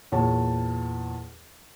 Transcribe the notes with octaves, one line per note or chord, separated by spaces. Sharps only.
E2 A#2 C#5 A5